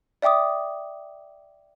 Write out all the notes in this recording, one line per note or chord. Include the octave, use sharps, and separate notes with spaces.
D5 E5 G5 D6 D#6